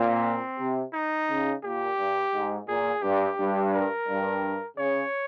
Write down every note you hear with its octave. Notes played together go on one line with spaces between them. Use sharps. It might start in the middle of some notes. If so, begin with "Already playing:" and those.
Already playing: A#2 C4
C3
D#4
C#3
A#2 G4
G2
G#2
A#2 G#4
G2 G4
G2
A#4
G2
C#3 C#5